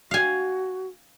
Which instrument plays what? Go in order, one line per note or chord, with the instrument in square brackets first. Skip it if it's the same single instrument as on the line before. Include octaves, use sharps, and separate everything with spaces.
[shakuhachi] F#4 [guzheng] F5 G#5